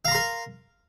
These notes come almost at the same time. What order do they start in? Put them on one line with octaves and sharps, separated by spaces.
F5 A#5 C6 A#4